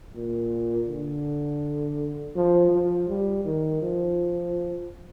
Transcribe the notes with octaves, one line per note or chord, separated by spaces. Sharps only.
A#2
D3
F3
F3
G3
D#3
F3